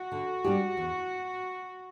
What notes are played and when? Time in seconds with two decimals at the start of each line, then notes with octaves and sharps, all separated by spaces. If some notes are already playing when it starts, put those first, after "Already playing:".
Already playing: F#4
0.12 D3
0.44 G3 D4 G4
0.77 E2